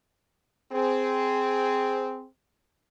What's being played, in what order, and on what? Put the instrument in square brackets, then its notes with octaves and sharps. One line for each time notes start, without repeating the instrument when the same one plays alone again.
[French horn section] C4 G#4